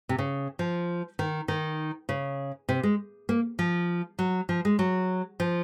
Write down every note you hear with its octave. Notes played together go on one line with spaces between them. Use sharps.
C3
C#3
F3
D#3
D#3
C#3
C3
G#3
A#3
F3
F#3
F3
G#3
F#3
F3